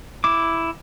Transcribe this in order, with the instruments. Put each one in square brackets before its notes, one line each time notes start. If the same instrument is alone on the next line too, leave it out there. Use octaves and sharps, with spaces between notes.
[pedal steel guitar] E4 D6